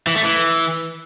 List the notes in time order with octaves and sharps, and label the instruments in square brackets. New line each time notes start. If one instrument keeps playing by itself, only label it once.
[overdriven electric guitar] E3
A3
E3